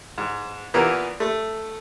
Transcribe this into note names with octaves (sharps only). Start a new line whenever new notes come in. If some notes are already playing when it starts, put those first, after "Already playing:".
G#2
A#2 E3 A#3 B3
A3